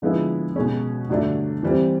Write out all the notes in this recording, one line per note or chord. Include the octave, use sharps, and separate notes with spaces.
D3 F3 G#3 B3 E4
B2 G#3 C#4
G2 D3 F#3 A3 D4
E3 G3 C4